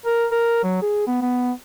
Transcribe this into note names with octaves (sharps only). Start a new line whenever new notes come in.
A#4
A#4
F#3
G#4
B3
B3